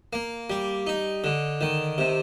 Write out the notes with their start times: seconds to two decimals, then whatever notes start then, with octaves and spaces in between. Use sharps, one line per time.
0.13 A#3
0.50 G3
0.87 D#4
1.24 D3
1.61 D#3
1.98 C3